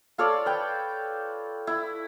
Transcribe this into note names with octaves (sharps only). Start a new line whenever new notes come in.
F4 A4 C#5 D5
B4 G5
E4